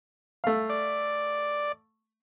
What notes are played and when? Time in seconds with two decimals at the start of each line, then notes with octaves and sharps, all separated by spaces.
0.44 A3 F5
0.70 D5